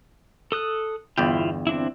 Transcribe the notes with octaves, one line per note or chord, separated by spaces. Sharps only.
A4 D#6 F#6
G1 E2 E4 F4 G5
C4 D4 E4